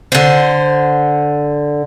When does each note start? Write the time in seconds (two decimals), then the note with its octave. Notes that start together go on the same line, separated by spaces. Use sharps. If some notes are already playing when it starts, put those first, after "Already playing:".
0.12 D3 C5